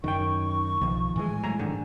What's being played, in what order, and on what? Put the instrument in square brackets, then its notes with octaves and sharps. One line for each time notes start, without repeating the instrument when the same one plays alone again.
[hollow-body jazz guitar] F#2 G5 [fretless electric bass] D#3 [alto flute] C#6
[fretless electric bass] B1 [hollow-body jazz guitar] D#3 F3
[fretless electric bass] A2 E3 G#3 [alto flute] G#5
[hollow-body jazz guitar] F#3 A3 A#5
G#2 D3 D#3